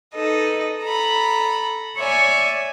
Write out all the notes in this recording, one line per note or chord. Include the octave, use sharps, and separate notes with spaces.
D#4 A4 B4 D#5
A4 A#5 B5
C#5 D5 E5 G#5